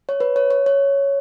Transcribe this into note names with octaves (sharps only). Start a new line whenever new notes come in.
C#5
B4
C#5
C#5
C#5